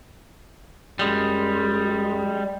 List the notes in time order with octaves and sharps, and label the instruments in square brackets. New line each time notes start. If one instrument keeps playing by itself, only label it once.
[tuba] F#2 [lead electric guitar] G3 G#3